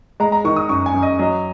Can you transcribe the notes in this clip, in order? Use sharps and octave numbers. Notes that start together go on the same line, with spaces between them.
G#3 A#5
A#5
D#3 C#6
D#6
F#2 C#6
G#5
F#2
D#5
F#3 D#5